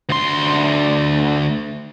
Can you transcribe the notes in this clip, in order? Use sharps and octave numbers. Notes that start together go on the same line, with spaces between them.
D2 C6